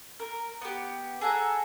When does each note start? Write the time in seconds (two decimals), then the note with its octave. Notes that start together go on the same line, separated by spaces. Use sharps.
0.20 A#4
0.61 B3 G4
1.21 G#4 A4 F#5 A#5